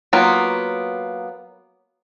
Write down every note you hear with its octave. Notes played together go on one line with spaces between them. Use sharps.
F#3 A#3 B3 F4